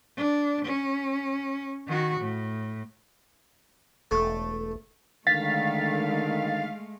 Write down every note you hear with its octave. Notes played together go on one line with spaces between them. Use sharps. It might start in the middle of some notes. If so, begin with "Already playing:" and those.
D4
C#4
D#3 F#4
A2
E1 A3
D3 D#3 G#3 A3 F5 A6 B6